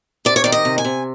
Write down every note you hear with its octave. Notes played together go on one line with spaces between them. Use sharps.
C3 D5
C#5
D#3 D5
D#5
C3
G#5
C3